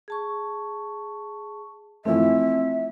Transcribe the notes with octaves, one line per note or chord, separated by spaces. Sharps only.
G#4 A5 C#6
E3 F3 A3 C4 E5 E6